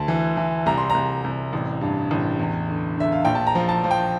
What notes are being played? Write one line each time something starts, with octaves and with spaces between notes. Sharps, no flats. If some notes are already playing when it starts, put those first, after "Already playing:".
Already playing: D2 A5
E3
E3
C2 A#5
C6
C2 A#5
C2
A1
G2
A1
E2
D3
D3 E5
F5
A#1 G5
A5
A#5
F3
A5
F3
G5